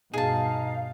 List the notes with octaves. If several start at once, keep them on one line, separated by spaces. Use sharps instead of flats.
G2 B2 D#4 G#4 F5 A5